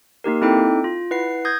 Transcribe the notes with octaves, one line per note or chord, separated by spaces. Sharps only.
A#3 D#4 G4 A#4
C4 D#4 E4 A4 G5 D6
F4
E4 B4 F#5 C7
D#6 G6 G#6 A#6